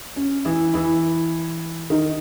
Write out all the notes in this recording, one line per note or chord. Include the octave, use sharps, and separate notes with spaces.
C#4
E3 E4
E3 E4
D#3 D#4